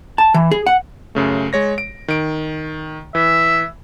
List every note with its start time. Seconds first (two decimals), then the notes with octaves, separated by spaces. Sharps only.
0.18 A5
0.34 E3
0.51 G#4
0.66 F#5
1.15 F#2 C#3 A3
1.53 G#3 C#5 A#6
1.78 D7
2.08 D#3 D7
3.15 E3 E5